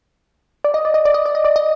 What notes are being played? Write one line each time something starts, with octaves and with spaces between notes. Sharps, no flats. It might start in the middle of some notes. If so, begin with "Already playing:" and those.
D5
D#5
D5
D#5
D5
D#5
D5
D#5
D5
D#5